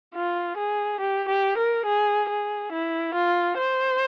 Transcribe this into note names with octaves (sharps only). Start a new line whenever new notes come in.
F4
G#4
G4
G4
A#4
G#4
G#4
E4
F4
C5